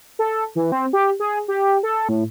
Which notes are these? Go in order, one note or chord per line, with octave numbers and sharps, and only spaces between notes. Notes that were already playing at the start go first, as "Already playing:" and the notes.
A4
E3
C4
G4
G#4
G4
A4
A2